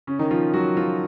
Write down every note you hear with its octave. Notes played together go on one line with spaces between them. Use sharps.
C#3 C#4
D#3 D#4
F3 F4
F#3 F#4
F3 F4